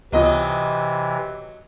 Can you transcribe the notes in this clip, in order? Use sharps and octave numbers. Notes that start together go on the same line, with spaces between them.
C#2 C3 E3 F#3 B3 F4 D#5